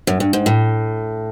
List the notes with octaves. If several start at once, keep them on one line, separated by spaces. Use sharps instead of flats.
F#2
G2
G#2
A2